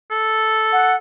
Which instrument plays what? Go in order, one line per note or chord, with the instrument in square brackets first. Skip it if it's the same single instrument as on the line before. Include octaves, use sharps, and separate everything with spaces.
[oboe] A4
[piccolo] F#5